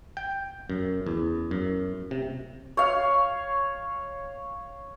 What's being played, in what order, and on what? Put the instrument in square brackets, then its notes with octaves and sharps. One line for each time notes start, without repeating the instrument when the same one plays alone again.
[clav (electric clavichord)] G5
F#2
E2
F#2
C3
[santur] C#5 F5